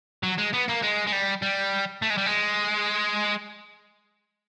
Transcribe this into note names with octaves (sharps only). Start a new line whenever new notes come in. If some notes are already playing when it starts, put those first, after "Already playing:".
F#3
G#3
B3
A#3
G#3
G#3
G3
G3
A3
G#3
G3
G#3